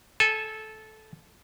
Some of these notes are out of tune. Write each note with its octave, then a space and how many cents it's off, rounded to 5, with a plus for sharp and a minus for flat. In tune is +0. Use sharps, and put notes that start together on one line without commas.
A4 -15 G#5 +0